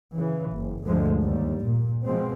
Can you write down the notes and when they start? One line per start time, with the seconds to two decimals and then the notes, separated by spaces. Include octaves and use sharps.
0.14 C#3 E3
0.52 F#1
0.85 D2 G2 D3 F3 G#3
1.20 D#2 G3
1.64 A#2
2.05 B2 F3 G#3 C4